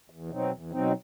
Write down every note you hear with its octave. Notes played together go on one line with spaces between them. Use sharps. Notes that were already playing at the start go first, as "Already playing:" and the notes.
E2
B2 F#3 C4 D#4
E2
B2 F#3 C4 D#4